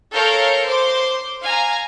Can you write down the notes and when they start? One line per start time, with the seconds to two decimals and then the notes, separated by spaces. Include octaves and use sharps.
0.14 A4 A#4 C#5 F5 F6 G6
0.66 C5 C6 D6
1.42 F5 G#5 A#5